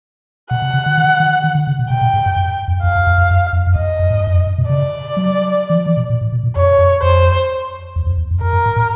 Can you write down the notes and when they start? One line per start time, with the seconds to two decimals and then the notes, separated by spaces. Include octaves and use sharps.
0.51 B2 F#5
0.62 C3
0.74 C#3
0.86 D3
0.98 D#3
1.20 D#3
1.44 D#3
1.55 D3
1.67 C#3
1.79 B2
1.90 B2 G5
2.01 A#2
2.14 G#2
2.26 G2
2.36 F#2
2.68 F2
2.83 F2 F5
2.95 F2
3.07 F2
3.18 F2
3.31 F#2
3.53 F2
3.67 F#2
3.76 F2 D#5
3.99 F2
4.11 G#2
4.19 G2
4.27 F#2
4.35 F2
4.47 F#2
4.58 B2
4.69 C#3 D5
5.17 F#3
5.70 E3
5.75 F3
5.86 E3
5.97 B2
6.10 A#2
6.21 A2
6.32 B2
6.43 A#2
6.56 F2 C#5
6.78 F2
7.02 F2 C5
7.96 E2
8.06 F2
8.18 E2
8.31 F2
8.41 F#2 A#4
8.53 G2
8.66 G#2
8.76 A2